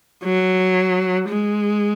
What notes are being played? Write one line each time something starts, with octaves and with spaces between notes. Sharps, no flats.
F#3
G#3